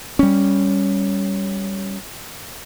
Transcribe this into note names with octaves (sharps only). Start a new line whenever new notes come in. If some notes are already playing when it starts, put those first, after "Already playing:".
G3 C#4